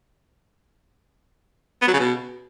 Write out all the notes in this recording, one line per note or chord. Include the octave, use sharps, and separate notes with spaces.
B3
F#3
C#3
B2